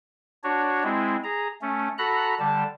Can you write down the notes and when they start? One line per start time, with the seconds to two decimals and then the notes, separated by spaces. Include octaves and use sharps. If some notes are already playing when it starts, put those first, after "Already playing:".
0.44 D4 F#4 C#5
0.84 G#3 C4 E4
1.24 G#4 A#5
1.62 A3 C#4
1.98 F#4 A4 A#5 B5 F#6
2.39 D3 G3 A5